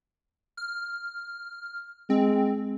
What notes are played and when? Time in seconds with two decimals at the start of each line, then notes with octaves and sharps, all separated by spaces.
0.57 F6
2.10 G#3 C4